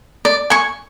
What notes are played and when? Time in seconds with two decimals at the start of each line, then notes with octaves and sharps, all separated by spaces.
0.25 D5
0.50 G#5 C#6